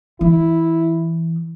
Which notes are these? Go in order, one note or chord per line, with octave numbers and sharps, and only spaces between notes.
E3 E4